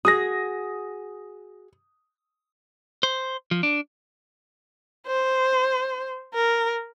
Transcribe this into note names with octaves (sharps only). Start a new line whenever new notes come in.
F#4 G#4 D#6 A#6
C5
F3
D4
C5
A#4